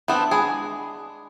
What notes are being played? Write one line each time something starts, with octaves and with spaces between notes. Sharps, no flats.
E3 B3 C4 D4
G#3 G#4 G#5 B5 D#6